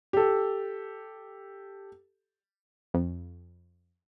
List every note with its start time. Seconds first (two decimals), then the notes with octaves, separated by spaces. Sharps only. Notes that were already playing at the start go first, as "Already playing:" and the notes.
0.13 G4 A4
2.94 F2